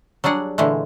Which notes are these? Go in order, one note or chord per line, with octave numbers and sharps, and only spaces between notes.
F#3 G3 D4 G#4 F#5
A#2 D3 E3 G#3 A3